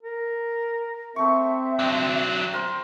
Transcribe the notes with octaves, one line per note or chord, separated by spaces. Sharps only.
A#4
A3 C4 E5 C#6
F#3 D4 G5
A#4 C5 C6